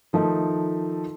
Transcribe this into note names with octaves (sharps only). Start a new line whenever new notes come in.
D#3 F3 A3 D#4